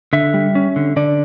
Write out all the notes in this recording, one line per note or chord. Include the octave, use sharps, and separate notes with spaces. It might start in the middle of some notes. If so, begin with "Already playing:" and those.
D3 E5
G3
C#4
D3
D3 D5